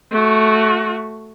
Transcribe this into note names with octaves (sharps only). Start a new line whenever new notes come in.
A3 F#4